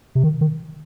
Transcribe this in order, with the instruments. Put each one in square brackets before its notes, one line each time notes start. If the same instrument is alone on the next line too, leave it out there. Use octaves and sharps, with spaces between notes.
[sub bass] C3
D#3
D#3